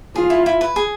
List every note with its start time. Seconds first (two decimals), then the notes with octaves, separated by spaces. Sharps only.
0.15 F4 G#4
0.30 E4
0.46 E4
0.61 B4
0.76 G#4